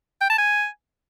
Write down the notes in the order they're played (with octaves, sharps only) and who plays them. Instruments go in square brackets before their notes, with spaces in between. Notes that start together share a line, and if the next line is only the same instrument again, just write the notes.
[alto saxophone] G5
A5
G#5